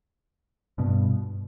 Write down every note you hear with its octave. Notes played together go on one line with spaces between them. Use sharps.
G2 B2